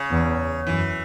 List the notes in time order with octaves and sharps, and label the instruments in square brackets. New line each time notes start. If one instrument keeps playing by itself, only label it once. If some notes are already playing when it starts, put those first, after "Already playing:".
Already playing: [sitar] C#3
[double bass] E2
[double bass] F#2 [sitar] E3